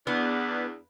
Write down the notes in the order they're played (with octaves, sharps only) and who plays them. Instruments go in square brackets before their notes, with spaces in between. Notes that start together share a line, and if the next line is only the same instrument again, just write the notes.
[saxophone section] E2 D4 [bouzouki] B3